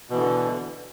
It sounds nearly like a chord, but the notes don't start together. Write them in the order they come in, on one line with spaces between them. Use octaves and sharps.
B2 E3 D3